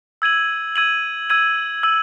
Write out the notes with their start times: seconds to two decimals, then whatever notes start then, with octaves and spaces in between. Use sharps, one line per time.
0.22 E6 G#6 D#7 F#7
0.76 E6 G#6 D#7 F#7
1.30 E6 G#6 D#7 F#7
1.83 E6 G#6 D#7 F#7